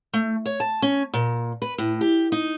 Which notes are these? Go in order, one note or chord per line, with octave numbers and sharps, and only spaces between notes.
A3
C#5
A5
C#4
A#2
B4
A2
G4
D#4